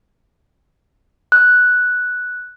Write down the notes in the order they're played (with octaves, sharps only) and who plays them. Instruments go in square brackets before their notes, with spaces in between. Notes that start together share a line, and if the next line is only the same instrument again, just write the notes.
[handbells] F#6